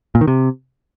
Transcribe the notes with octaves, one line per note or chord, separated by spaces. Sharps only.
A#2
D#3
C3